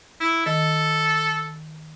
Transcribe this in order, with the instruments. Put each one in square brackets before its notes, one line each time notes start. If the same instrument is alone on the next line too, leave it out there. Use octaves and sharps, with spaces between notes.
[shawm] E4
[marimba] D#3 [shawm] A4